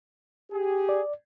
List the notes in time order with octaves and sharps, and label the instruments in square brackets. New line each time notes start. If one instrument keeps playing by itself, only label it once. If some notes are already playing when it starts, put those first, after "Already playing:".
[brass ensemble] G4 G#4
[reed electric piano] D5